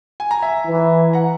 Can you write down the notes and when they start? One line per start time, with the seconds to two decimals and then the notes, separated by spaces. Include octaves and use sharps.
0.20 G#5
0.31 A#5
0.42 E5 G#5
0.67 E3
1.13 F#5 A#5